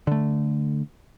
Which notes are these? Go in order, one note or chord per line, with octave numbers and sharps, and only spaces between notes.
D3 A3